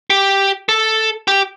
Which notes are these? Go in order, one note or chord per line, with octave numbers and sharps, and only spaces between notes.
G4
A4
G4